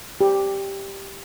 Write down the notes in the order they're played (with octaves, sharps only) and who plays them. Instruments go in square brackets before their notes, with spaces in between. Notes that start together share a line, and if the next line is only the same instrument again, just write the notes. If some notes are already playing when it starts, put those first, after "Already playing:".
[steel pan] G4